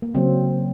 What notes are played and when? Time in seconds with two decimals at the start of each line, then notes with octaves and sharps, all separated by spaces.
0.02 A#3
0.14 C#3 F#3 A#3 C4